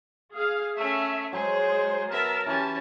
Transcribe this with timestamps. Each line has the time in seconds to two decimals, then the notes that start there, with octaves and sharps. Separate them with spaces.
0.33 G#4 F5
0.77 A3 C#4 E5
1.33 F#3 G#3 G#4 C5
2.10 B3 A#4 E5 A5
2.47 E3 C#4 G4 A5